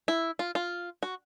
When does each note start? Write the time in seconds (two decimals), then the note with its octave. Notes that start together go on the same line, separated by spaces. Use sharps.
0.08 E4
0.39 F4
0.55 F4
1.03 F#4